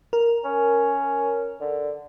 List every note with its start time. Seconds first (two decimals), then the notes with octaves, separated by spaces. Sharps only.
0.13 A#4
0.45 C#4
1.60 D3